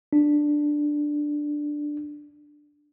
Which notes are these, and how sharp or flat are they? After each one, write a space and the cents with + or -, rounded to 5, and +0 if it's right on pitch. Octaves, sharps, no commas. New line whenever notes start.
D4 +5